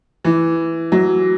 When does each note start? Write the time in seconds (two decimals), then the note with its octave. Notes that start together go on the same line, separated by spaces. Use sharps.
0.24 E3
0.92 F#3